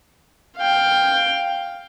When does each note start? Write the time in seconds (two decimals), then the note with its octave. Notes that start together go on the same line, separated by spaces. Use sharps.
0.57 F5 G5